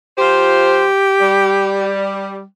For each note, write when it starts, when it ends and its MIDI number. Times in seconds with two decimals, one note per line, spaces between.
0.18 0.84 53
0.18 0.84 65
0.18 1.93 67
0.18 0.84 72
1.21 2.43 55